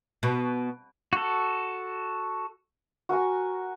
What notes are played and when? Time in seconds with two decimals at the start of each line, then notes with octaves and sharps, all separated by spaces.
0.23 B2
1.13 F#4 A4
3.09 F#4 A#4 G#5 C#6